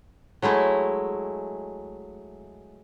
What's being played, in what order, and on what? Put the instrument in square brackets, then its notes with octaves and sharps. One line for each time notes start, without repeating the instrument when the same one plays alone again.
[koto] F#3 G#3 A3 E4